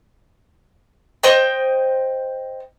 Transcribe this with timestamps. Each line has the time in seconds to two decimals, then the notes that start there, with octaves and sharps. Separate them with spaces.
1.23 C5 D#5 G5